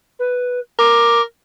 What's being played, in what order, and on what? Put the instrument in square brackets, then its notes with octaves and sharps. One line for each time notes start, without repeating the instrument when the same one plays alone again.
[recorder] B4
[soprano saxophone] A#4 [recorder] D6